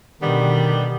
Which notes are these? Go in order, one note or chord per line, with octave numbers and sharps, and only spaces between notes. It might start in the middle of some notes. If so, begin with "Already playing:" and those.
B2 D3 D#3 G3 B3